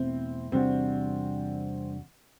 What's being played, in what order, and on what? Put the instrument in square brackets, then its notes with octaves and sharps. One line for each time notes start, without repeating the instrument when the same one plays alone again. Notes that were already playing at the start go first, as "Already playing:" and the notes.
Already playing: [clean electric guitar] E2 B2 A3 E4 [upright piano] C4
[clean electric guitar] E2 C3 G3 D4 F#4 [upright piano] C4